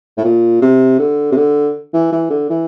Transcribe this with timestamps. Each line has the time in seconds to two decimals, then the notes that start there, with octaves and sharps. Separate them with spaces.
0.17 A2
0.24 A#2
0.61 C3
0.99 D3
1.32 C3
1.36 D3
1.93 E3
2.12 E3
2.30 D3
2.50 E3